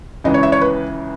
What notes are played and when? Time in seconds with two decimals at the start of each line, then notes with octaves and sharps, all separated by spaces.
0.24 C#2 C#3 E3 D#5
0.34 C#5
0.43 E5
0.52 C#5
0.61 B4